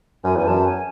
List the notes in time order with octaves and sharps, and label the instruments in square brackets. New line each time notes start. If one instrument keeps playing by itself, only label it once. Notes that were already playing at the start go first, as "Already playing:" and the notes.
[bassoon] F#2 [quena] G#5
[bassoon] E2 [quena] G#5
[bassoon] F#2 [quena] A5
[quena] G#5